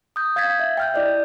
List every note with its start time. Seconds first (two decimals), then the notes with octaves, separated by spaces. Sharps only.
0.16 D#6 G6
0.36 F5 G#6 A6 B6
0.59 E5
0.77 G5 F6 G6
0.94 E4 D5 D#5